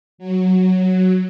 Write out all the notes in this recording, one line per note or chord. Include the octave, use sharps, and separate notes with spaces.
F#3